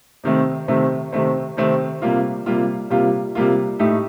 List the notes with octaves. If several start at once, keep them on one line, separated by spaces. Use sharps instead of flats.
C3 D#3 A3 C4
C3 D#3 A3 C4
C3 D#3 A3 C4
C3 D#3 A3 C4
C3 G3 A#3 F4
C3 G3 A#3 F4
C3 G3 A#3 F4
C3 G3 A#3 F4
A2 A3 D#4 G4